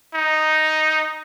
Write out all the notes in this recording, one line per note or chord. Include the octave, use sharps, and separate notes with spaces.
D#4